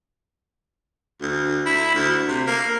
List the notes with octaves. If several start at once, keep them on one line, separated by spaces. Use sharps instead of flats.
D2
E4
D2
C3
A#3